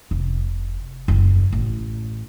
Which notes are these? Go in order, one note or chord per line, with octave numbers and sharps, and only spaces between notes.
F1
F#1 E2
A1